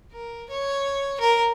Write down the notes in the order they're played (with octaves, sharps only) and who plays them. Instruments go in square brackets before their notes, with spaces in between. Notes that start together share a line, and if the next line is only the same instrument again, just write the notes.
[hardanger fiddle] A#4
C#5
A#4